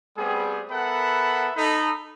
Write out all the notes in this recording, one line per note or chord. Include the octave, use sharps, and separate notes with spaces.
G3 A3 B3 C4 G#4
B3 A4 A#4 E5 F#5 B5
D#4 A4 B5